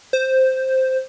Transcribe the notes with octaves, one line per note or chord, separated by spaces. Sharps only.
C5